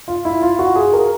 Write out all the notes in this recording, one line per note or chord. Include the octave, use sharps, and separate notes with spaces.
F4
E4
F4
F#4
G#4
A#4